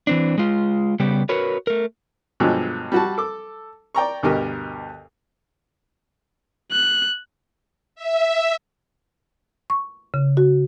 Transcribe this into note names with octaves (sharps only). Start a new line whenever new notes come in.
E3 C4 D4
G#3 F4
C#3 G3 B3 G4
F#4 A#4 B4 C#5
A3 A#4
G2 B2 D3 F3 F#3 G#3
G3 F#4 A5
A4 D6
D5 G5 A#5 C#6
D2 G2 B2 G4 A#4 D#5
F#6
E5
C#6
C#3
F#4